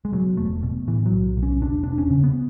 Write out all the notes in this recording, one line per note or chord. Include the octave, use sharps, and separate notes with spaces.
G#3
B2 F#3
E1 A3
B2
A2 E3
F#3
B1
B1
C#4
E1 D4
E1 D4
C#4
C#3
B3